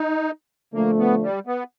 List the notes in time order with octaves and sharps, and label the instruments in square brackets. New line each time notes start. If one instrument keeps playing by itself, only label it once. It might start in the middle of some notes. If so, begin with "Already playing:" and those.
Already playing: [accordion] D#4
[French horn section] D3 F3 A3 [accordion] A#3
[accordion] B3
G3
B3